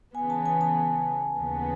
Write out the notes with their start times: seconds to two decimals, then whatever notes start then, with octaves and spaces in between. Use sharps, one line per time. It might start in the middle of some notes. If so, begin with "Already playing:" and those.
0.15 C#3 E3 B3 G#5
0.30 A5
0.46 G#5
0.61 A5
1.38 D#2 C#3 E3 B3